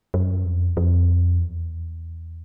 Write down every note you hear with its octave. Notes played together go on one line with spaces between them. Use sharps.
F#2
F2
F2
E2